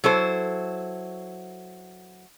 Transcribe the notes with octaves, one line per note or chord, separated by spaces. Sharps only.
F#3 E4 A4 C5